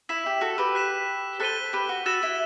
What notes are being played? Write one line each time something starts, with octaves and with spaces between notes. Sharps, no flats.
E4 E6 B6 E7
G4
F#4 A4
G4 B4
F#6 B6 E7
A4 C5 F#6 B6 D#7 G7
G4 B4
F#4
F#4 E6 A6 E7
E4